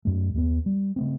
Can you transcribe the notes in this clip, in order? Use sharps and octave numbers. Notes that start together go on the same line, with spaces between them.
F#2 A3
D#2 G#3 B3
G3
C#3 A3 C4